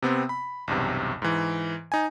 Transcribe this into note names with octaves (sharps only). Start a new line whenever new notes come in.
C3 B3 C4
B5
B1 E2 G2 C3
G#2 E3
D#4 G#5